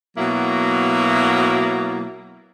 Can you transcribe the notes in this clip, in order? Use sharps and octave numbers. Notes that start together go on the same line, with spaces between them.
B2 F#3 A#3 E4